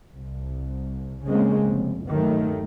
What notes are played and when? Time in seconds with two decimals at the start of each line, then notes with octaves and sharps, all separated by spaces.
0.16 C2
1.26 C#3 G#3 A#3 C4 C#4
1.67 F1
2.05 G1 D#2 D#3 F#3 A3